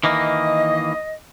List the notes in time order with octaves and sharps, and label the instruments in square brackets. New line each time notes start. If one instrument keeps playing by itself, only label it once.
[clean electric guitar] D#3 E3 A#3 [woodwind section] D#5